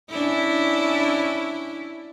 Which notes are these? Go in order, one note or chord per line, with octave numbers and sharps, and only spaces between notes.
C#4 D4 E4